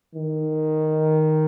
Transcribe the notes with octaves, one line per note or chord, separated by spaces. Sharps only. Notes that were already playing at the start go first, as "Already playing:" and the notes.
D#3